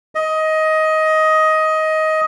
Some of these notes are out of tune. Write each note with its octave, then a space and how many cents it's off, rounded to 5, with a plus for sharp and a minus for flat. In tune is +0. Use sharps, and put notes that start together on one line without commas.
D#5 +15